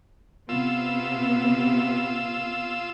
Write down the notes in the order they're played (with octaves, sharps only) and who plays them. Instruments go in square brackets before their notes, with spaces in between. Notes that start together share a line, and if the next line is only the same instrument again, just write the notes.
[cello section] C3 B3 [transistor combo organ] F4 E6